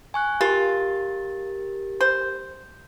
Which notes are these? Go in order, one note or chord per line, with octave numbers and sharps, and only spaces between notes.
G#5 C#6 F#6
F4 G4 A#4 A6
C5